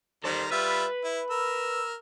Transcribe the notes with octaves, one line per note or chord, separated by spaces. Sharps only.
D#3 G3 A4 C5 A#5
G3 F4 B4 E5
E4
A#4 E6